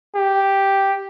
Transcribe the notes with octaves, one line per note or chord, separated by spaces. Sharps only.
G4